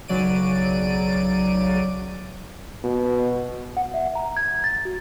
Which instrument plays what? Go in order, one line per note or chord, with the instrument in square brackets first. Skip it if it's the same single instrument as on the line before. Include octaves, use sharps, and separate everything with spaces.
[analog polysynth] B1 C#3 F#3 D5 D7 D#7
[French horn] B2
[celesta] F#5
E5
A#5
G#6
A6
F#4